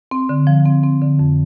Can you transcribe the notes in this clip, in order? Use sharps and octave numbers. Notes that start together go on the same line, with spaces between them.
C4
D3
F3
C4
C4
D3
F2